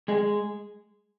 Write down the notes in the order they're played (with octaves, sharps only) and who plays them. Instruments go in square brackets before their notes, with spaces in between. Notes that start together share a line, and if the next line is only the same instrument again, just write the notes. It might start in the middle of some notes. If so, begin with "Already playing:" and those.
[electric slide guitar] G#3 G#4